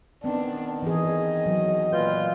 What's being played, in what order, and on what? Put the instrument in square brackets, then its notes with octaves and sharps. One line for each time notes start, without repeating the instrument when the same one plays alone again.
[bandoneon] D#3 [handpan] B3 C4 [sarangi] D4
[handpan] E3 G#4 [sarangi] D#5
[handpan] F#3
[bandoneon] A#2 F4 G6 [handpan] B4